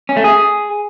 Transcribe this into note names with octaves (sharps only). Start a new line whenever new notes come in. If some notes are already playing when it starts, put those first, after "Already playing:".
C#4
A3
G#4